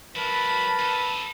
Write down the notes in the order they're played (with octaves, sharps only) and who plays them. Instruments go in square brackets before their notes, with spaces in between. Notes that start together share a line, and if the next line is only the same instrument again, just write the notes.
[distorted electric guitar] F#3 E4 [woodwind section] A#4 B4 A5 [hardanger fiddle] B5
[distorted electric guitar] D#4 A4